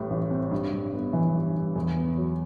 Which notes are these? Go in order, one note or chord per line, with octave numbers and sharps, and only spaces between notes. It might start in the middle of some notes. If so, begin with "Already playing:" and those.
Already playing: A1 A2 G3
A1
C4
G2
G2
B3
E3
G2
G2
E2
B3
F#3